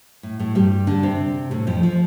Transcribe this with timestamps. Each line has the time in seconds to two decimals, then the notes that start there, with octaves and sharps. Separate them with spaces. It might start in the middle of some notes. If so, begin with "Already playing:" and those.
0.23 A2
0.40 A2 A3
0.55 G2 G3
0.87 D3 D4
1.03 C3 C4
1.51 A2 A3
1.67 F2 F3
1.83 F3